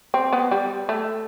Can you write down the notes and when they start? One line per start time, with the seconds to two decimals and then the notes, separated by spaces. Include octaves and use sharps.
0.14 C4
0.33 B3
0.51 G3
0.89 A3